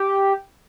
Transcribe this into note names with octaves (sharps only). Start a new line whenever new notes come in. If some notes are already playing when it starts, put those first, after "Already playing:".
Already playing: G4